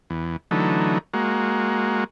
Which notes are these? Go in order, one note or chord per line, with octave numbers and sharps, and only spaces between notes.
E2
D3 E3 F#3 A3 D#4
G#3 A#3 F#4